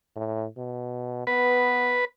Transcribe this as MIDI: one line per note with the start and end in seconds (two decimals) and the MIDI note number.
0.16 0.46 45
0.57 1.24 47
1.27 1.99 59
1.27 2.05 71